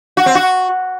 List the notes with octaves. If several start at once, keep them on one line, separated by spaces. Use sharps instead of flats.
F#4
C4
F#4